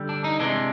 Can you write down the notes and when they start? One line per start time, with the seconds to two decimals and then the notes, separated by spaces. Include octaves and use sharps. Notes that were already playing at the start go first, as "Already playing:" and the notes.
Already playing: D3 G3
0.09 D4
0.24 D#4
0.39 C3 E3 G#3 D4